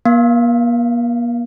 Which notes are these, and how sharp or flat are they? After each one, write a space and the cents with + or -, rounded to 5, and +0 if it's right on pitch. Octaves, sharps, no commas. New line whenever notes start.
A#3 +40 F5 +0